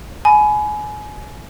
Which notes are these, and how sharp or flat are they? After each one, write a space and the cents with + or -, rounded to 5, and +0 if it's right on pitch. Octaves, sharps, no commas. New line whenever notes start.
G#5 +25 B5 +0